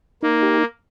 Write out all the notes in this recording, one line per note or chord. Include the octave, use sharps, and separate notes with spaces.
A#3 D#4
G4